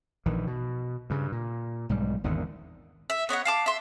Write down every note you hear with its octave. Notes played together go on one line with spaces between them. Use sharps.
A#1 D#3 E3
B2
G2 C#3
A#2
B1 G#2 G3
G#1 E2 D3 D#3
E5
B3 C#5 D#5 F#5
F5 A5 D6
E5 C6